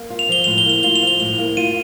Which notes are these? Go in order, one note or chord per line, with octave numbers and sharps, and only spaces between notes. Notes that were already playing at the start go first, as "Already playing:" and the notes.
Already playing: A#3
F4
F7
F3 G7
A2 F7
G7
A#3 F7
F4 G7
F7
F3
G7
A2 F7
A#3
F4 D#7